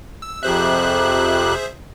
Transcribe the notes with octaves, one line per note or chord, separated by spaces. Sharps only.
E6
F2 C3 G#4 C5 E5 F#6